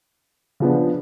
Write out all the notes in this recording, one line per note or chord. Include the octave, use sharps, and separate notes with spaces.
C#3 F3 B3 D4